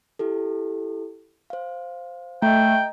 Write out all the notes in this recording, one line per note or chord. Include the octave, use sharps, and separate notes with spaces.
E4 G4 A4
C5 F5
A3 D#5 G5 A#5